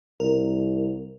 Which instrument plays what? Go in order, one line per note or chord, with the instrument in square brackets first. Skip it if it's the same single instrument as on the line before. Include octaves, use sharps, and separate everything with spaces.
[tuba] C2 [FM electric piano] A#4